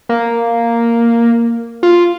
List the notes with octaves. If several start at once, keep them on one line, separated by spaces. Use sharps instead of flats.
A#3
F4